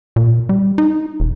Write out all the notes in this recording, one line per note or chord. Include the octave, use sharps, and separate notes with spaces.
A#2
G3
D#4
E1